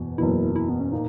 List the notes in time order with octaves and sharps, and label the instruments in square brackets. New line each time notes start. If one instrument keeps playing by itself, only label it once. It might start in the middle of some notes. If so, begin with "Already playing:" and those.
Already playing: [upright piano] F#1 E2 B2
[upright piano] F#1 E2 B2 [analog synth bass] E4
[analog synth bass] E4
B3
C#4
[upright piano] A#2 A#3 [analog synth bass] D#4